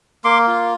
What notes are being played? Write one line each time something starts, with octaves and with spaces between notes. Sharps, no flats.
A#3 C6 D6
F4